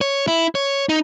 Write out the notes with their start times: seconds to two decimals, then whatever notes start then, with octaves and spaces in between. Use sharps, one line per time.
0.01 C#5
0.28 E4
0.55 C#5
0.89 D#4